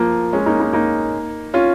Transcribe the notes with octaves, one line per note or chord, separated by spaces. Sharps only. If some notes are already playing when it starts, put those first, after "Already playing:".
Already playing: F3 A#3
G#3 C#4
A#3 D#4
A#3 D#4
A#3 D#4
C#4 F4